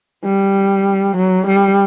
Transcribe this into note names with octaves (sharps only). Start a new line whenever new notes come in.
G3
F#3
G3